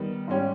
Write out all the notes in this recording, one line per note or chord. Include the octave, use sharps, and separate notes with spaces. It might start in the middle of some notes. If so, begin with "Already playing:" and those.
Already playing: D#3 G3 B3
G#2 G3 C#4 G4